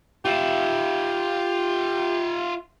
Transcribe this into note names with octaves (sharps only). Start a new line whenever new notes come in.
F4 G4 E5